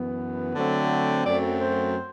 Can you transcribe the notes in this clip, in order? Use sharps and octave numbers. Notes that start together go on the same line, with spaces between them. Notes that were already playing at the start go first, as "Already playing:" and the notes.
Already playing: F#2 E3 B3
D3 F#3 A3 C4
F#2 F#3 A3 C4 D5
C5